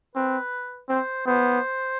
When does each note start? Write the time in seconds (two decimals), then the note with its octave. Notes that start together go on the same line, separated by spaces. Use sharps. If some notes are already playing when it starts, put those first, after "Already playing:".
0.15 C4 B4
0.89 C4 C5
1.26 B3 C5